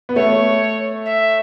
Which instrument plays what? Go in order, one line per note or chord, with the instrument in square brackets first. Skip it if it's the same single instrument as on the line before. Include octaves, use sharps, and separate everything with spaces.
[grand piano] B3
[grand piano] A3 [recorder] C#5
[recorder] E5